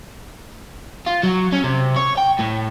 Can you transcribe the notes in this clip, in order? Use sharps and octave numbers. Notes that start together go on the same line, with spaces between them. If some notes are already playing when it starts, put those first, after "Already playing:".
F4
F#3
C#4
C3
C#5
G5
A2